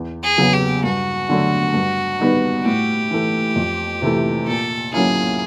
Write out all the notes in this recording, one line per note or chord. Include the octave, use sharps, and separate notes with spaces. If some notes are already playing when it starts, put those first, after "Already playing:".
Already playing: E2
G#4
C#3 F#3 B3
G4
G2 F#4
D3 F#3 A3
G2
D#3 G3 B3 D#4
A2 G4
E3 A3
F2
C3 E3 A3
A#2 A4
F#3 A#3 C#4 E4 G#4